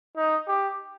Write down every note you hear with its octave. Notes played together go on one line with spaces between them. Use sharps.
D#4
G4